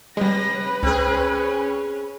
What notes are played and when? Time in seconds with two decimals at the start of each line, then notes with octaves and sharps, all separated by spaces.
0.17 C3 G3 G#3 B4 A#6
0.83 C#2 C4 C#4 G#4